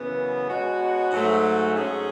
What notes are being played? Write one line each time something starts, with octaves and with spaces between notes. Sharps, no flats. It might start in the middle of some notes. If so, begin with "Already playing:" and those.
Already playing: F#2 C#3 E3 B3
B2 G#3 C#4 F#4
G#2 F#3 A3
G#2 F#3 A3 C#4 G#4